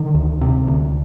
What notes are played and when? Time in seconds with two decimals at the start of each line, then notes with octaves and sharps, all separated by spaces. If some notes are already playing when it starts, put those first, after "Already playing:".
Already playing: D3 D#3
0.15 D2
0.41 C3
0.67 D2